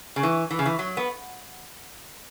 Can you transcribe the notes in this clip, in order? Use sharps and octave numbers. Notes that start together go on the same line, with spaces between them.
C#3
E3
E3
C#3
E3
F#3
B3